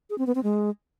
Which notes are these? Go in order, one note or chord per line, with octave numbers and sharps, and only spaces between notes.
G#4
C4
B3
C4
G#3